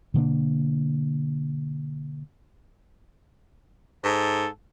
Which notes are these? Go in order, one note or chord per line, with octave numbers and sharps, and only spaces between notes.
B2 D3 A#3 D4
G#2 A4